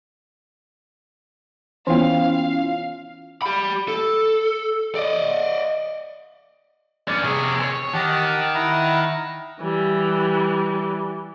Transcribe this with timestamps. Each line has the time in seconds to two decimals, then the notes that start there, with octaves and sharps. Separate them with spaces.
1.87 E3 B3 C#4 E4 F4 F5
3.42 G4 B5
3.88 A4
4.95 D5 D#5
7.08 G2 C#4 D5
7.23 C3 G#4 G#5 C#6
7.61 C5 C#5
7.93 D#3 G4 F#5 A5
8.55 E4 F#5 A#5
9.60 E3 G3